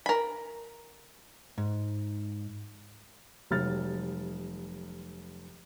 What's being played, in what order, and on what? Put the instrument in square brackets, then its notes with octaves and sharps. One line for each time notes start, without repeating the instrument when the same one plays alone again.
[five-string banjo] A#4 B5
[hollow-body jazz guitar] G#2
[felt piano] F1 F#3 G3 F6 A6